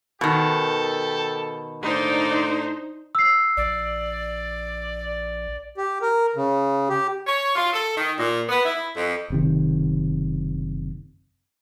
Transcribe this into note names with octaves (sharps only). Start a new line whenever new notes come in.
B2 D#3 G4 A4
A2 A#3 D4 D#4 C5 D5
E6 C7
A#1 D5
G4
A#4
C#3
G4
C#5
F4
A4
D#3
A#2
B3
E4
F2
F#1 C3 D#3